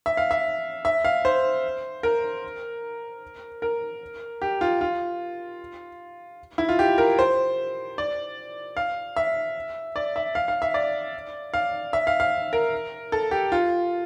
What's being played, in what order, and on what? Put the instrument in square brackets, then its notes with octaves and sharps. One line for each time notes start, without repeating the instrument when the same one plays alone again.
[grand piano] E5
F5
E5
E5
F5
C5
A#4
A#4
G4
F4
F4
E4
F4
G4
A#4
C5
D5
F5
E5
D5
E5
F5
F5
E5
D5
F5
E5
F5
F5
A#4
A4
G4
F4